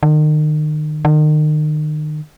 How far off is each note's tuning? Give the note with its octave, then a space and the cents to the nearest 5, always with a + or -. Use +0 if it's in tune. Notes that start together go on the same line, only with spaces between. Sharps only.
D#3 -35
D#3 -35